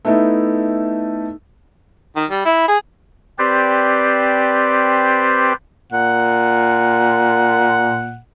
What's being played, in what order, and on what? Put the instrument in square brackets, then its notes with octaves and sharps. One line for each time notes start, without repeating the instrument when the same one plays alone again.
[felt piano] A3 B3 D#4 E4 A4
[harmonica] D#3
G3
E4
G#4
[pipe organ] C4 G4 B4 C5 D5
[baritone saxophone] A#2 [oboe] F#5